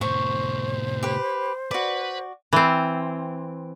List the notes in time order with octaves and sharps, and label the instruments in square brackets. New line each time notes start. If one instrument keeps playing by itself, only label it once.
[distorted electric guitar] A2 C3 [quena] C5 [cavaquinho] C#6
[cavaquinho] G4 B4
[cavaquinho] F#4 D5 [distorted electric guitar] B4
[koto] E3 C4